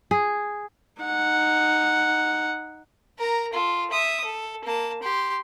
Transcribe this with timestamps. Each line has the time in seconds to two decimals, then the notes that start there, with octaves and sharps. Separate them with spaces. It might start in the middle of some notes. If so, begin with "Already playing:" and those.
0.11 G#4
1.02 D#4 F#5
3.18 A#4 A#5
3.53 F4 A4
3.90 E5 D#6
4.24 A4
4.65 A#3 A5
5.03 G4 C6